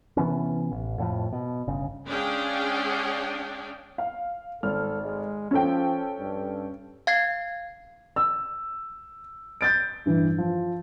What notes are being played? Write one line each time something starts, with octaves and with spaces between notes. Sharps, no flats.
C3 E3 B3 C#4
A1
F2 A2 F3
B2
G1 C#3
G#3 C#4 D4 G#4 F5 G5
F5
G#1 A4 F6
G#3
F3 C#4 A4 G5
G2
F5 G#6 C7
E6
G6 A6 D7
G2 E3
F3